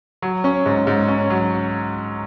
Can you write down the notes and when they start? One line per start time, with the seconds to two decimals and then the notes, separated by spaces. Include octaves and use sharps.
0.22 F#3
0.44 C#4
0.66 G#2
0.87 G#2
1.08 C#4
1.30 F#3